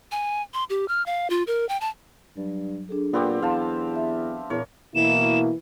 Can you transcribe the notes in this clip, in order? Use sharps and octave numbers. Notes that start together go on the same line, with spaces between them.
G#5
C6
G4
F6
F5
F4
A#4
G5
A5
G2 F#3
D4 G#4 A4
A#2 B3 C4 G4
E2 F5 A5 C6
E5
E2 A#2 A#4 C#5
B2 E3 A#3 E4 E7